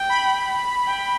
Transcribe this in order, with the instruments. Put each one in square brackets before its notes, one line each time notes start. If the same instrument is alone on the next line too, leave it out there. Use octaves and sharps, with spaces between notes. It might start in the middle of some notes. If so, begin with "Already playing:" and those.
Already playing: [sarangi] G5
[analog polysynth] B5
[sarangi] G5